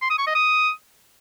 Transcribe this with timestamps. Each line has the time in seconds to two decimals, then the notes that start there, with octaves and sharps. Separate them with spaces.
0.02 C6
0.10 D#6
0.19 C#6
0.27 D#5
0.35 D#6